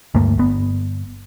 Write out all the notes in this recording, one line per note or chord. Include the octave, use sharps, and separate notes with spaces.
D2 G2 A3 A#3
G1 B3